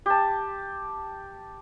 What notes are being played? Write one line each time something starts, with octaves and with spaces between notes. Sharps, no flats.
G4 A5